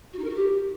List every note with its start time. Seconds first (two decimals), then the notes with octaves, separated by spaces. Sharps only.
0.13 F#4
0.19 D#4
0.24 A#4
0.30 F#4
0.35 G4